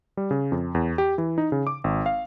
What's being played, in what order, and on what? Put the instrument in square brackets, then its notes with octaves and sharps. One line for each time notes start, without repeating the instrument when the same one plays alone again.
[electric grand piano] G3
C#3
F2
E2
G4
E3
D#4
C#3
D6
G#1
F5